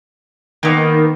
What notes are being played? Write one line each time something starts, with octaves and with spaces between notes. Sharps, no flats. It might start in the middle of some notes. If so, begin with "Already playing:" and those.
D#3 A#3 B3